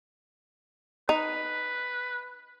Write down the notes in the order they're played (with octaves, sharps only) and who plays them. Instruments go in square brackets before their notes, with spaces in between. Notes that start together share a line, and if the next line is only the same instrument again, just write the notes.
[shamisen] D#4 [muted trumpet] B4